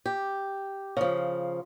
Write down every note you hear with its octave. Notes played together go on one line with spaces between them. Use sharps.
G4
C#3 F3